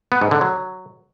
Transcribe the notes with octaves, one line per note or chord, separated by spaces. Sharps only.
B3
G#2
D3
F#3